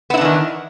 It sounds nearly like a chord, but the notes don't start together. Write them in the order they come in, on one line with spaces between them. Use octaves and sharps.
B3 E4 D4 E3 D#3